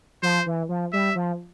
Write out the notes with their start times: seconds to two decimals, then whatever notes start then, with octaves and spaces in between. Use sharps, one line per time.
0.22 F3 C5
0.46 E3
0.69 F3
0.93 G3 E5
1.15 F3